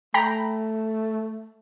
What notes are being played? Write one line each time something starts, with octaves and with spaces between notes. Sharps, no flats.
A3 G5 A#5 B5